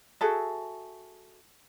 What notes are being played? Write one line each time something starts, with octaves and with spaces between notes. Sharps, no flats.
F#4 G#4 A4 E5